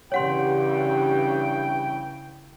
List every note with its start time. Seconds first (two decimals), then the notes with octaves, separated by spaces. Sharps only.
0.12 G2 C#3 E3 G4 C#5 F#5 G5 C6